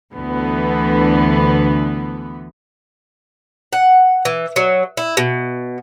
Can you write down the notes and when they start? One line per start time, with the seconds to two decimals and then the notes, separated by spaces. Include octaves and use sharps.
0.15 D2 D3 E3 B3
3.73 F#5
4.25 E3
4.56 F#3
4.97 E4
5.17 B2